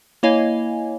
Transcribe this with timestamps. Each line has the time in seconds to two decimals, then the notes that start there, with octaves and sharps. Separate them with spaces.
0.23 A#3 E4 C#5 D#5 F5 G#5